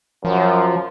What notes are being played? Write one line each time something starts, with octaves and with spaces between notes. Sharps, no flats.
F#2 F3